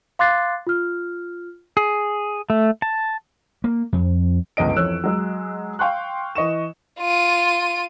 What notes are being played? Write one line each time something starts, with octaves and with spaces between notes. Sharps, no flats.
F5 C6 D6 F#6 A6 C7
F4 F6
G#4
A3
A5
A#3
F2
G1 C#2 B3 D#5 D7
F2 E3 C#5 E6 F#6
F#3 G#3
F5 G5 C6 C#6 F#6
E3 D#5 C#6 E7
F4 D#7